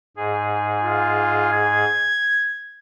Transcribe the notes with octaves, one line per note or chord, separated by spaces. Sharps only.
G#2 G#4
F4
G#6